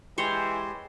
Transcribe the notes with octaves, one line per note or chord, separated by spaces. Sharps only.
E3 G#3 G4 C5 C#5 C6